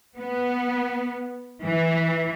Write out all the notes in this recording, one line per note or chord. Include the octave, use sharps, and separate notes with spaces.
B3
E3